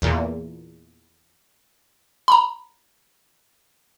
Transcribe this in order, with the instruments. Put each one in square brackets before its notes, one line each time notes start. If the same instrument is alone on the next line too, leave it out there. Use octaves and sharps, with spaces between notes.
[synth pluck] E2 A#2
[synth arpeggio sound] A#5 B5